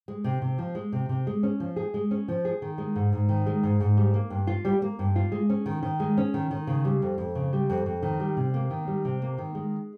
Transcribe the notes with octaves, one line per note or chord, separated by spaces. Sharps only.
G#3
C3
C3
F3
G#3
C3
C3
G#3
C#4
F3
G#4
G#3
C#4
F3
G#4
D#3
G#3
G#2
G#2
D#3
G#3
G#2
G#2
G3
A#3
G2
F4
G3
A#3
G2
F4
G#3
C#4
D#3
D#3
G#3
C#4
D#3
D#3
C#3
G3
F2
F2
C#3
G3
F2
F2
D#3
G3
C3
A#3
D#3
G3
C3
A#3
D#3
G#3